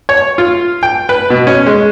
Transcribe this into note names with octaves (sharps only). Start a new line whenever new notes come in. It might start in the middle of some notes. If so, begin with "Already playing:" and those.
C#5
F4
G5
B4
B2
C#4
G#3